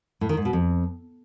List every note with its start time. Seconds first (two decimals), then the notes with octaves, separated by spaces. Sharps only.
0.21 A2
0.29 D#3
0.37 G#2
0.45 B2
0.53 F2